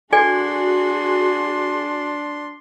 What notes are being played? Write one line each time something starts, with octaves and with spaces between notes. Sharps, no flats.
D4 F#4 G#4 A4 D5 G#5 C6